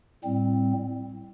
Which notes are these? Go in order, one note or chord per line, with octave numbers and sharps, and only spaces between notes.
A2 G3 C4